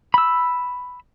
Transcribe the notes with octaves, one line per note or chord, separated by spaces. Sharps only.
B5 E6